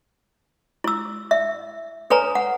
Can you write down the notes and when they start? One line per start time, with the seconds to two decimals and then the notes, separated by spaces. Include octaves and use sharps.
0.84 E4 E6
1.31 E5
2.10 A4 B4 C#5 G#5 A#5
2.35 F#5